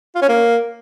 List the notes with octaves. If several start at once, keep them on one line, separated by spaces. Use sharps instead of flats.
F4
C#4
A#3